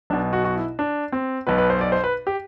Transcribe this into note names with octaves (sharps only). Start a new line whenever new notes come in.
B1 B2 D4
F#4
F#4
E4
D4
C4
B1 B2 B4
B4
C5
D5
C5
B4
G4